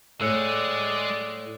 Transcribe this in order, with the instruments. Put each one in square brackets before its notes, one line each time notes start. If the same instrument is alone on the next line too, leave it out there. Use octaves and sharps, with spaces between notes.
[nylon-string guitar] A2 [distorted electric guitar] G#3 G#4 [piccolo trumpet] D5 [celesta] E6 F#6 C#7